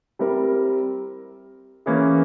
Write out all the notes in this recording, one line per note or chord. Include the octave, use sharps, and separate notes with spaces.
G3 C4 E4 A#4
E3 A#3 C#4 E4 G#4